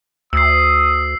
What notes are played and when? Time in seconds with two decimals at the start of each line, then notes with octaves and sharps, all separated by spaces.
0.33 D2 D#6 E6 C7